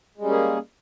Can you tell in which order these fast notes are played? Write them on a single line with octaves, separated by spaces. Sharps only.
G#3 G3 C#4 A#3 G#4